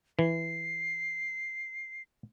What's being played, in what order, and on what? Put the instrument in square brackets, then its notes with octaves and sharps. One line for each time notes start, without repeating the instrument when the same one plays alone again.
[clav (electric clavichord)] E3 [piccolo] C7